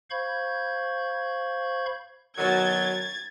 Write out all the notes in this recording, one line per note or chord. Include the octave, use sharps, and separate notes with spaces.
C5 F5 B5 C#6 G6 G#6
B2 D#3 F#3 G#6 A6